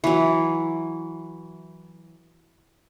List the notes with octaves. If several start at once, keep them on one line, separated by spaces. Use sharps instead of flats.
E3 F#3